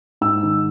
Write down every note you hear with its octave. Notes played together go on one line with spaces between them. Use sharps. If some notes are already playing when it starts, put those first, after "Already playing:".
G#2 E6
D#3